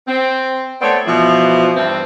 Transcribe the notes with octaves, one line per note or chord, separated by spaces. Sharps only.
C4
A3 B3 C4 C#5 D5
B2 E3 F3
G2 E3 C4